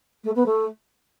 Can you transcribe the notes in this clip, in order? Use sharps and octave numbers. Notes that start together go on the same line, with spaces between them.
A3
B3
A3